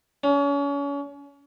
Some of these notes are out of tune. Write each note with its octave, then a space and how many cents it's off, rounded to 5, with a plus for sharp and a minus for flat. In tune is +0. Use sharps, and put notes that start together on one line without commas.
C#4 +35